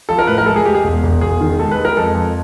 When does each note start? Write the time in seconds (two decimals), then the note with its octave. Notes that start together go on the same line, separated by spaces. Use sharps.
0.09 F3 A4
0.19 A#4
0.27 A2 B4
0.38 A#4
0.46 G#3 A4
0.56 G#4
0.65 G#3 G4
0.75 G#4
0.84 E1
1.03 E1
1.21 E1 G#4
1.41 D#3
1.59 G#3 A4
1.71 B4
1.78 G#3
1.85 A#4
1.97 F2 A4
2.15 F2